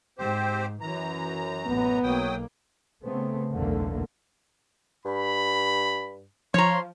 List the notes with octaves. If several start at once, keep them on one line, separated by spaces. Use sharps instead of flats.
G#2 C4 G4 C5
F#2 E3 A#5
A1 B3
B1 F#3 A#3 G5 D#6
C#3 A3 B3 C4
F#1 B1 E2 D3 A3 A#3
G2 B5
F3 C#5 A#5 C6